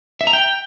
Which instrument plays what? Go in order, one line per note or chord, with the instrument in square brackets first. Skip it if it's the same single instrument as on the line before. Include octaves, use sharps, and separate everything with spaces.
[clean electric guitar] E5
A#5
G5